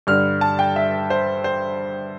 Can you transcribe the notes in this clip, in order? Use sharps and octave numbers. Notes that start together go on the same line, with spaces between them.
G2 D3 G3 F6
A5
G5
E5
C5
C5